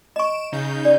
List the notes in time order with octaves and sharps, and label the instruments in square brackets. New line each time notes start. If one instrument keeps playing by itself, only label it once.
[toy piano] D#5 C#6 [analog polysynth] D7 E7
[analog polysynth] C#3 D#4 G6
[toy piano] D5